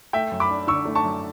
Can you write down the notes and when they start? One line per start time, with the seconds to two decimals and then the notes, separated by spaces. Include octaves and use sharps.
0.13 A3 E5 G5
0.32 F#2
0.40 B5 D6
0.50 D4
0.67 D3 C#6 E6
0.85 A3
0.95 A5 C#6
1.04 F#2